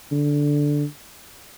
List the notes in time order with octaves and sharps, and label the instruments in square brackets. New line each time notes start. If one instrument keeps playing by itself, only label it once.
[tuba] D3